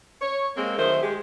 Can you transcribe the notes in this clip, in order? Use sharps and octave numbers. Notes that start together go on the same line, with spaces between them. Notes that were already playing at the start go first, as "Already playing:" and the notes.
C#5
G#3 A#3 C4
D#3 F#3 A3 G#4 A#4 C5
G#3 G4